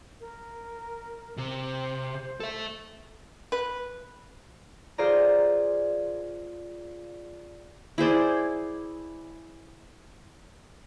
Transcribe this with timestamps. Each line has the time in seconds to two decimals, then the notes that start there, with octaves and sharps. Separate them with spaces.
0.20 A#4
1.37 C3
1.63 C5
2.40 A4 E5
3.52 B4
4.98 F4 G#4 C5 D5 A#5
7.98 E4 G#4 C5 D5